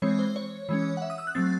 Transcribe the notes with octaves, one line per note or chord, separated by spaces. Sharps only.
E3 G#3 C4 C#5
C5
C#5
E3 G#3 C#4
F#5
E5
D#6
E6
F#6
F#3 A3 C4 A6